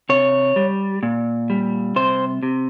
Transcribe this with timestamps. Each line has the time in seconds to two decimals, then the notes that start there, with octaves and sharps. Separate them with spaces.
0.09 C3 C#5
0.56 G3
1.03 A#2
1.50 G3
1.96 C3 C5
2.43 C3